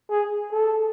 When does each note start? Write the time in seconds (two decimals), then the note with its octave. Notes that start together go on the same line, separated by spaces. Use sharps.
0.11 G#4
0.52 A4